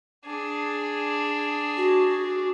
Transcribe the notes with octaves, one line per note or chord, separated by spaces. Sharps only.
D4 G#4
F#4